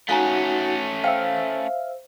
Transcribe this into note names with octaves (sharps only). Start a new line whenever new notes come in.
A3 C#4 D#4 F#4 F5 F#5 G#5 A#5
C5 E5 F5 G5